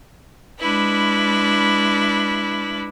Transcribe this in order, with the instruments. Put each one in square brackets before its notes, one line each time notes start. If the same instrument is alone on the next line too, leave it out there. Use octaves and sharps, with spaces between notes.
[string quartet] G#3 D4 E4 B4